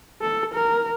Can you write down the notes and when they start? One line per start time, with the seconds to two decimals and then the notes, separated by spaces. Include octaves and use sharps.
0.21 A4
0.54 A#4